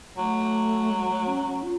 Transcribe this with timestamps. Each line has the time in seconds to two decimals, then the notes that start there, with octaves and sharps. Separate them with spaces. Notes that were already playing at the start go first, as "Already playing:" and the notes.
0.17 F#3 A3
0.91 G#3
1.09 A3
1.27 C#4
1.45 C#4
1.63 F4